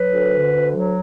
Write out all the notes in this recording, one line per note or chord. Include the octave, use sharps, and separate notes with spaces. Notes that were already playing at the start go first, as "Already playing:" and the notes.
Already playing: F#3 B4
D2
D3
D2
F#3